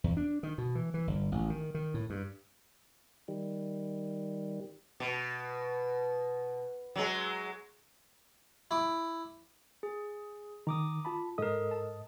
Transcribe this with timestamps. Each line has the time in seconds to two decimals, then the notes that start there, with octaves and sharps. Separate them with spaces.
0.04 E2
0.17 D4
0.43 D#3
0.58 B2
0.75 E3
0.94 E3
1.07 G1
1.32 A1
1.50 D#3
1.74 D#3
1.94 A2
2.10 G2
3.28 D#3 G3
5.00 B2
6.96 F#3 G#3
8.71 E4 D6
9.83 G#4
10.67 D#3 A#5 D6 D#6
11.05 F4 A5 B5
11.38 G#2 A4 A#4 D#5 D#6
11.71 A5